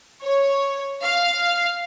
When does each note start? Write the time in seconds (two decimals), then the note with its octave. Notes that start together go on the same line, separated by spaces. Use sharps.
0.23 C#5
1.03 F5